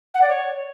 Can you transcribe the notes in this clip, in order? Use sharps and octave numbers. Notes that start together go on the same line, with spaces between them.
F#5
D5
C#5